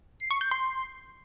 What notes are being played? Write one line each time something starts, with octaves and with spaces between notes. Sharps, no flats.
C7
C#6
G6
C6